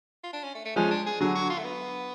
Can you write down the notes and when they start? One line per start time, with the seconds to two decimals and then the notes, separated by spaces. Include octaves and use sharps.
0.24 F4
0.33 D4
0.43 C#4
0.55 A3
0.65 A3
0.76 F3 G#3 C#4
0.91 D4
1.06 G#4
1.21 D3 F#3 G#4
1.35 F#4
1.50 F4
1.58 A3
1.64 B3